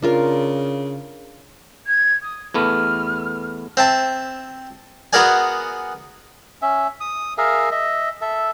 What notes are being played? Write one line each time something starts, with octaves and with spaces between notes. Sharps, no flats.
C#3 D4 F4 A#4
G#6
D#6
E2 A3 B3 F6
C4 E5 A5
B3 F#4 G#4 A#4 D5 G#5
C#4 E5
D#6
G#4 A#4 E5 F5
D#5 E5
A4 E5